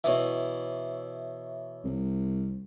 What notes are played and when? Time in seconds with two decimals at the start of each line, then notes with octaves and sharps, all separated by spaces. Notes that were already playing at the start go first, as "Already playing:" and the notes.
0.04 B2 E3 C#5 E5
1.84 C2